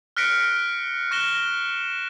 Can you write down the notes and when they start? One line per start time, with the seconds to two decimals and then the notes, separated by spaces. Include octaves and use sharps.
0.17 F6 F#6 A#6 B6 C#7 D7
1.11 C#6 F#6 A#6 E7 G7